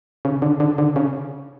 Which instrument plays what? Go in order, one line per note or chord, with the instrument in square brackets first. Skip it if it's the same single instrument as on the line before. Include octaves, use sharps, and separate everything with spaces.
[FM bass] C#3
D3
D3
D3
C#3